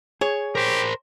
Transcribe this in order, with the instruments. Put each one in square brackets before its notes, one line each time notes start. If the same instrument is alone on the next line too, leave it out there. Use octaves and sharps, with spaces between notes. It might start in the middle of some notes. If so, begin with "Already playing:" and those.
[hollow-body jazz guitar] G#4 [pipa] C#5
[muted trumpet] G4 [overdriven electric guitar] A#4 C5